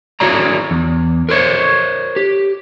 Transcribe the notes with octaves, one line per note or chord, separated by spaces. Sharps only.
E4 F#4 G#4 C#5 D5 A#5
E2
A#4 C5 C#5
G4